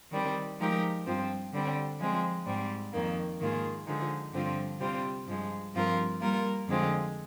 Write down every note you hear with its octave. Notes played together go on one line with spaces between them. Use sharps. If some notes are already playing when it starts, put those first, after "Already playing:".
D#3 G3 C4
F3 G#3 D#4 G4 A#4
G2 F3 C4
D3 G3 C4
F3 G#3 C4
G#2 G3 C4
F2 D#3 A#3
G#2 D#3 A#3 F4 G#4
D3 F3 G#3 D#4
G2 D3 F3 C4 F4
C3 G3 C4 F4
G2 F3 G#3
G2 F3 C4 F4 A#4
G3 A#3 F4 A#4
F2 D3 G#3 C4 F4